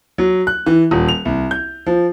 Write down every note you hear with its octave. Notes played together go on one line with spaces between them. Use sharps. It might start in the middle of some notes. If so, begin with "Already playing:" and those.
F#3
F#6
E3
D#1
F7
C2
G6
F3